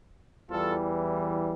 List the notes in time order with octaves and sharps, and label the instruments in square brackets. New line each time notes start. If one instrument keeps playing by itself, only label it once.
[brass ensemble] E2 E3 G3 F4 A4